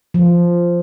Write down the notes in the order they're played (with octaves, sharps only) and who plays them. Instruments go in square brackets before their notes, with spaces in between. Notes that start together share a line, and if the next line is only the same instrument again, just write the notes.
[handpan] F3